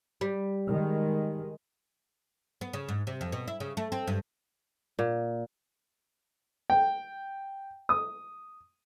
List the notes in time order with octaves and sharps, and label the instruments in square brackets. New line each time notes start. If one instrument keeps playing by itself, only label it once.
[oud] G3
[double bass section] D#3 G#3
[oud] B3
C#3
G#2
C3
F2
B2
E4
C#3
A3
C4
G2
[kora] A#2
[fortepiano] G5
D#6